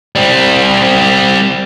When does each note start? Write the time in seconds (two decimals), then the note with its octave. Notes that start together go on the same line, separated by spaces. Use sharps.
0.15 G3 C4